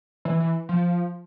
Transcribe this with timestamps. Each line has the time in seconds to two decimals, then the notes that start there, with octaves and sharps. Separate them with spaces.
0.25 E3
0.40 E3
0.69 F3